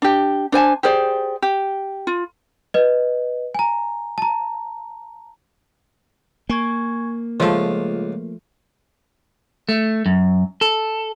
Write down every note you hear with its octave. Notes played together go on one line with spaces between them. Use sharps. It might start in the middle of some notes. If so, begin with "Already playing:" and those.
D4 G4
D4 C5 G#5 A5
G4 G#4 C5 D5
G4
F4
B4 D#5
G#5 A#5
A5 A#5
A#3 G#5 C#6 G#6
C#2 F3 A3 F4 G#4
A3
F#2
A4